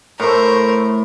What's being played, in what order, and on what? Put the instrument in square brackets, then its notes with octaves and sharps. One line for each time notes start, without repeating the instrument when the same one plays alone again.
[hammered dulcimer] A2 A3 [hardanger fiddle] A#4 C5